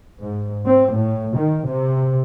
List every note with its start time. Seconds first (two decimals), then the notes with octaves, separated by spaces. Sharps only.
0.22 G#2
0.66 C4
0.96 A2
1.37 D#3
1.66 C3